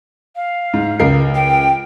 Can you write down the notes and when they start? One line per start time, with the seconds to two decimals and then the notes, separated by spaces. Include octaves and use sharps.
0.36 F5
0.74 G#2
1.00 C#2 A#4 C7
1.35 G5